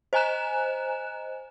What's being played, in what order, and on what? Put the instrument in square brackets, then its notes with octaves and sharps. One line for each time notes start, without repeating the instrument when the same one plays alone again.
[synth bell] C5 D#5 G#5 A#5 F#6 E7